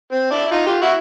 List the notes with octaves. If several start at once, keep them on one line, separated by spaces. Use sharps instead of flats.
C4
D4 E4
E4
D#4 F4
F4 G4
E4 F#4